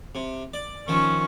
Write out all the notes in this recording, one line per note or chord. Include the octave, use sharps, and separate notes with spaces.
C3
D5
D#3 F3 C#4 C#6